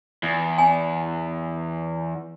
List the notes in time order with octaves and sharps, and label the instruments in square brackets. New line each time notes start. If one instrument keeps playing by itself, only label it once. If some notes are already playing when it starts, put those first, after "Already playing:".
[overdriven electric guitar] E2
[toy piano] G#5